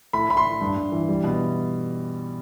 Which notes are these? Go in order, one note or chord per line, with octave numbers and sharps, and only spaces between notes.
A2 B5
A2 B5
C6
A2
G2
G2
E3
G3
B2